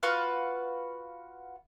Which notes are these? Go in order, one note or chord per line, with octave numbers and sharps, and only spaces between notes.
F4 F#4 B4 F5